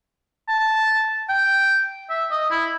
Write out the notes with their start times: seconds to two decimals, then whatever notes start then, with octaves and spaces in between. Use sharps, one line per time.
0.48 A5
1.29 G5
2.10 E5
2.31 D#5
2.51 E4